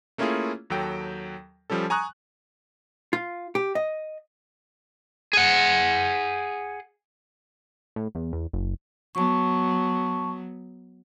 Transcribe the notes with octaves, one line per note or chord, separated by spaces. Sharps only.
A3 A#3 C#4 E4 F4 G#4
D#2 F#3 A4 G5
F3 G3 C#4 A4
G#5 A#5 C#6 D#6 F#6
F4
G4
D#5
G#4 F#5
A2
E2
E2
F#1
F#3 B3 A5 C#6